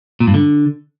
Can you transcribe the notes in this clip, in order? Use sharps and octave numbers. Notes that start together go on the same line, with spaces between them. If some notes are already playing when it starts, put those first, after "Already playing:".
A#2
G2
D3